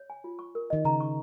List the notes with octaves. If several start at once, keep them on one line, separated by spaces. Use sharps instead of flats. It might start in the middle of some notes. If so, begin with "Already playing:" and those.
Already playing: C#5
G#5
F4
C#6
A#4
D#3 D#5
C#3 A#5
C#6